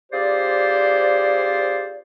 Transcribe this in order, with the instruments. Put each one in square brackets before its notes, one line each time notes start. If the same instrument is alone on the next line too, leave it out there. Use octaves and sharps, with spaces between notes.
[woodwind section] C4 F4 G4 G#4 C5 D5